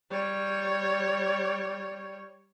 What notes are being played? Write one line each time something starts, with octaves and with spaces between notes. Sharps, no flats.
G3 C#5